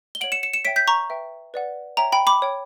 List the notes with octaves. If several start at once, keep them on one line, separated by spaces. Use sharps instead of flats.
G7
C#5 F#5 D7 F#7
C#7 E7
C#7 E7
C#7 E7
C#5 E5 G5 B6 D7
G6 B6
A#5 C#6
B4 E5 G5
B4 D5 F#5
C#5 E5 G5 A#5
G5 B5
B5 D6
C#5 G5